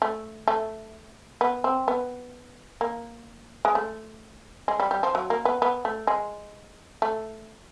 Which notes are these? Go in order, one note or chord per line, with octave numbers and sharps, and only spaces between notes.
A3
A3
B3
C4
B3
A#3
G#3
A3
G#3
G3
G3
F3
F#3
A#3
B3
B3
A3
G#3
A3